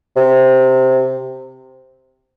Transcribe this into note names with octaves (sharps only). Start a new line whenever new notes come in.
C3